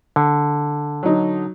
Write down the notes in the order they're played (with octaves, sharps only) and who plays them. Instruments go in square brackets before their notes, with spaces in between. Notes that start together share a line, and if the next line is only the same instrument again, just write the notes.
[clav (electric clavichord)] D3
[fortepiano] F#3 D#4